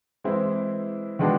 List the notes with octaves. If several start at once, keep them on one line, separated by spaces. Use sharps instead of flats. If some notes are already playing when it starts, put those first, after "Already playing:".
E3 G#3 C4 E4
D#3 G#3 B3 D4 F#4